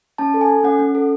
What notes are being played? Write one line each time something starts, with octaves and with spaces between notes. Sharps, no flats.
C#4 A5
A4
G#5
A4
C#4 F#5
C#4
A4